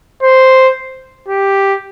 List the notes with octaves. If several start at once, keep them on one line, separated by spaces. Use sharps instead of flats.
C5
G4